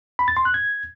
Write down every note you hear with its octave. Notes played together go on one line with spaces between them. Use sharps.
B5
A6
C6
F#6
G#6